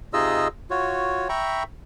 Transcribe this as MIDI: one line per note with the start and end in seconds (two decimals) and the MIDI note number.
0.13 0.48 48
0.13 0.48 63
0.13 0.48 65
0.13 0.48 68
0.13 0.48 75
0.13 0.48 88
0.70 1.28 65
0.70 1.28 66
0.70 1.28 73
1.29 1.63 76
1.29 1.63 79
1.29 1.63 82
1.29 1.63 83
1.29 1.63 85